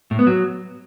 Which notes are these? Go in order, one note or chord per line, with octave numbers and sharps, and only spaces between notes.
A2
B3
F#3